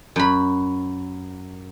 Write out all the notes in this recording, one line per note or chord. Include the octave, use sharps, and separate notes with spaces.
F#2 B5